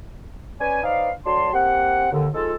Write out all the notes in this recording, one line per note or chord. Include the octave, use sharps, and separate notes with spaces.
C#4 B4 D5 G#5
D#4 B4 C5 D5 F5
D2 F#3 D5 A5 C6
A#3 C4 G4 F#5
D#2 D3
F3 G#3 D#4 F4 A4